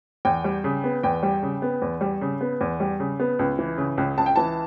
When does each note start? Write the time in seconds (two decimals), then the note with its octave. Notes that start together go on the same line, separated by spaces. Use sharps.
0.25 E2 G5
0.44 G3
0.64 C#3
0.84 B3
1.03 E2 G5
1.23 G3
1.43 C#3
1.62 B3
1.82 E2
2.01 G3
2.21 C#3
2.41 B3
2.61 E2
2.80 G3
3.00 C#3
3.20 B3
3.39 C#2
3.59 E3
3.78 C#3
3.98 C#2
4.17 C#2 A5
4.26 G5
4.36 E3 A5